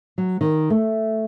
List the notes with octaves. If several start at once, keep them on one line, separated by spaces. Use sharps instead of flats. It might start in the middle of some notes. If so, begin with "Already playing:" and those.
F#3
D#3
A3